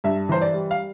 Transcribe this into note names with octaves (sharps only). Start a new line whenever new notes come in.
G2 E5
E3 C5
D5
G3
F5